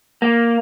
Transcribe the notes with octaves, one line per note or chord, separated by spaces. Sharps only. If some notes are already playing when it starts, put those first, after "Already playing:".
A#3